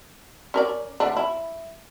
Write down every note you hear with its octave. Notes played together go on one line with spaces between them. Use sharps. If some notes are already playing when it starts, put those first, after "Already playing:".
C#4 A#4 D5
D3 A3 D4
E4